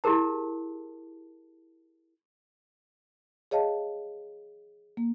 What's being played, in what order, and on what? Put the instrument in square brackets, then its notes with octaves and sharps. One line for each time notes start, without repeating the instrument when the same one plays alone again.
[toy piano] E4 G4 G#4 A#4 A5
[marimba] G#4 C#5 D#5 F5 A5
A#3